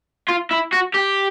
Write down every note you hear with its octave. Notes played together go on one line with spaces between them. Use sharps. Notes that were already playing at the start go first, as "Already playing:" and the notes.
F4
E4
F#4
G4